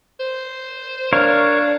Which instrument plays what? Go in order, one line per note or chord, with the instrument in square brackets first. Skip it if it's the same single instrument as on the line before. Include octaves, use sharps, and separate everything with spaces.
[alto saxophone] C5
[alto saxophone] D4 [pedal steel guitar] A#4 C#5 F5